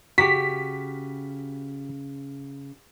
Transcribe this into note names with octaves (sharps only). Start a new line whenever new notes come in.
C#3 F#4 G4 B6